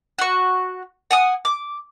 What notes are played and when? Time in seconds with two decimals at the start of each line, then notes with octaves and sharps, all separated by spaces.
0.19 F#4 C#6
1.11 F#5 G#5 D#6
1.45 D6